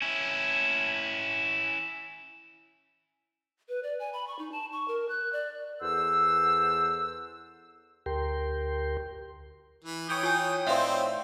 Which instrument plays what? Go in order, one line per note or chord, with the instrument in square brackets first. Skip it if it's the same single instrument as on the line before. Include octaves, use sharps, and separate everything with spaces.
[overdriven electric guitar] C#4 E4
[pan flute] B4
D5
G#5
B5
C#6
D#4
A5
C#6
A#4
F#6
D5
[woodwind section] E2 A4 C5 F#5 E6
[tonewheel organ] D2 G4 A#4 G5 C6
[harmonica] E3
[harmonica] E3 D#6 [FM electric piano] C#5 G5 G6
[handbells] F4 G#5
[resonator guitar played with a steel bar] A2 C5 [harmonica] C4 D#4 E4 [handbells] D5 E5 F5